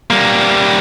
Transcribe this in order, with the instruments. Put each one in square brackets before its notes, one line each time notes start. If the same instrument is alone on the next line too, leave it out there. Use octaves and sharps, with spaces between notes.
[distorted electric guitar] G3 A#3